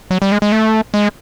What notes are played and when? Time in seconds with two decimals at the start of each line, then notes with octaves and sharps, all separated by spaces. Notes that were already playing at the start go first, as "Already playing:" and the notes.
0.11 F#3
0.22 G3
0.32 G#3
0.42 G#3
0.52 A3
0.94 G#3